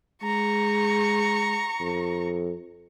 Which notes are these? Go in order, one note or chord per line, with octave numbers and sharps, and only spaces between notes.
G#3 A#5 C#6
F2